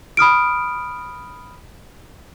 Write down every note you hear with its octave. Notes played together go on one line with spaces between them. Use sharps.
B5 D#6 F6 D7